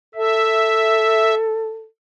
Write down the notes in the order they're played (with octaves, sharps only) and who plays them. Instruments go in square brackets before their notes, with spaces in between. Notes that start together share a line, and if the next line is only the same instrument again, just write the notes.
[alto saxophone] A4 [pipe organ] E5